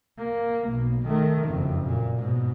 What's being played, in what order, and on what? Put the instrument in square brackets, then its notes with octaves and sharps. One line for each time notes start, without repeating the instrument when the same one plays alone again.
[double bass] A#3
B1
D#3 A3
F#1 F2
A#2
G#2 B2